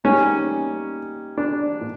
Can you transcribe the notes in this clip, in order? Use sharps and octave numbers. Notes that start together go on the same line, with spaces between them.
G3 A#3 C#4 D#4
D4
A#2